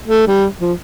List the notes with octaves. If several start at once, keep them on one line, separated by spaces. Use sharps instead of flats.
A3
G3
F3